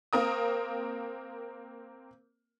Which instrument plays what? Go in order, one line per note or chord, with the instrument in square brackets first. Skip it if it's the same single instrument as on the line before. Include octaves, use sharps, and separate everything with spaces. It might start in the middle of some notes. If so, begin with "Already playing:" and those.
[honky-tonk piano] A#3 C4 A#4 D#6